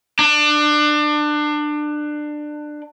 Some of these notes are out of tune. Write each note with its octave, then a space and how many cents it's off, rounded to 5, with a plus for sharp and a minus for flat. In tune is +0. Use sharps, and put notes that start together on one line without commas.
D4 +25